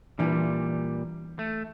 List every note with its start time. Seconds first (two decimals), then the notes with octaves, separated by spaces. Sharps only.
0.19 A#2 E3 G3 D4
1.39 A3